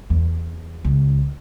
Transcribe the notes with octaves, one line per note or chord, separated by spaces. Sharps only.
E2
C#2